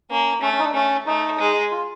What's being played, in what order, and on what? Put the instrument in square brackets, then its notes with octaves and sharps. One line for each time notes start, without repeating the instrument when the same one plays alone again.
[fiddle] A#3 [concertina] C#4
[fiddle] A3 [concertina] C#4
[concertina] C#4
D#4
D4
[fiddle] A3 [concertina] C#4
[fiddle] A3 [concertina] D#4
[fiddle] G#3
[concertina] F4